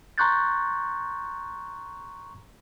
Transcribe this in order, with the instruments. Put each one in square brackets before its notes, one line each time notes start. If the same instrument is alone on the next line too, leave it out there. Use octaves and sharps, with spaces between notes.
[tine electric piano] A#5 C6 C#6 F#6 G6 A6